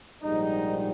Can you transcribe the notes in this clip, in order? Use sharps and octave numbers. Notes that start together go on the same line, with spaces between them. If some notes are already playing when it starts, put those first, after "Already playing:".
A#1 G#2 G3 D#4